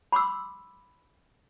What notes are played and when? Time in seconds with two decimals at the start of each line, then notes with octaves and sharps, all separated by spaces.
0.12 B5 C6 D6 E6